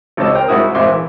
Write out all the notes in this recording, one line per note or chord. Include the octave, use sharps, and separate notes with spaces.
G#1 C#2 C4 D#4 A5 E6
A#4 C5 G5 A#5
C2 G#2 C3 E4 F#4 D#6
A#1 G#2 C4 E5 C6 D6
E3